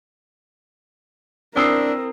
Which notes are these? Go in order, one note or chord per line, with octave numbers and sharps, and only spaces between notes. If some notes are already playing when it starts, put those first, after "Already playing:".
C4 D4 E4 A#4 D#6 E6 C7